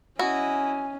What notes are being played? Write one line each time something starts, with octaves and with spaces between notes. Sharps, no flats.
C#4 E4 F#4 D#5 G#5